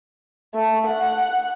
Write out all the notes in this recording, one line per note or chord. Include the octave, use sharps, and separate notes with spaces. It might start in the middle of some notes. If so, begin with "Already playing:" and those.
A3
F#5